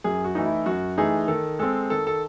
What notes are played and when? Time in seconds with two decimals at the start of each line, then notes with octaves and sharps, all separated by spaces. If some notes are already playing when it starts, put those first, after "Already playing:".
0.04 F#2 G#4
0.24 F#4
0.35 E3 A3 D#4
0.46 E4
0.66 F#2 F#4
0.98 E3 A3 D#4 G#4
1.28 D#3 A4
1.59 G#3 C4 A4
1.90 D#3 A4
2.07 A4